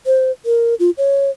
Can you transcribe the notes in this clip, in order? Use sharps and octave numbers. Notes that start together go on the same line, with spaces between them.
C5
A#4
F4
C#5